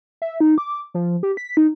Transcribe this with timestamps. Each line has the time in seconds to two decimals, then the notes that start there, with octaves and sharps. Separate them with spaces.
0.22 E5
0.40 D#4
0.58 D6
0.94 F3
1.23 G4
1.37 B6
1.57 D#4